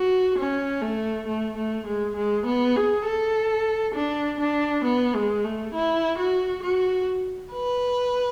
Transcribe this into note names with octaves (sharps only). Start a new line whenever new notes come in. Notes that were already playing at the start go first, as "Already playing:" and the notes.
Already playing: F#4
C#4
A3
A3
A3
G#3
G#3
B3
G#4
A4
D4
D4
B3
G#3
A3
E4
F#4
F#4
B4